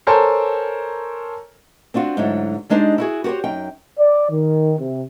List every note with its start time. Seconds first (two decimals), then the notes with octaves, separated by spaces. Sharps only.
0.07 A4 A#4 C5 C#5 G#5 A5
1.94 C4 D4 F4 F#4
2.17 G#2 D3 F#3 A3 E4
2.70 G3 G#3 D4 D#4 C5
2.98 E4 F#4 G#4
3.24 F#4 G4 A#4 C5 C#5
3.44 F#2 D#4 G5
3.98 D5
4.30 D#3
4.78 C3